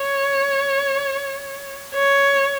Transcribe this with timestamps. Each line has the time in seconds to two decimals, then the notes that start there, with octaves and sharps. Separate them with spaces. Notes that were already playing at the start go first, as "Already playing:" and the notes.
Already playing: C#5
1.94 C#5